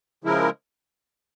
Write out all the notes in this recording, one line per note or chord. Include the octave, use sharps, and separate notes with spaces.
C#3 F3 G#3 E4 A#4